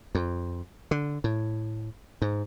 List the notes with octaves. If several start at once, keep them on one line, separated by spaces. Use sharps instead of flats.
F2
D3
A2
G#2